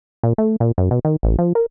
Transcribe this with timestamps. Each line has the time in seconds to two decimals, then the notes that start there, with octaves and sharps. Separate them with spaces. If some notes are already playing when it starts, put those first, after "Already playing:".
0.23 A#2
0.38 A3
0.60 A#2
0.78 F#2
0.91 B2
1.05 D#3
1.23 A1
1.39 F3
1.55 A#4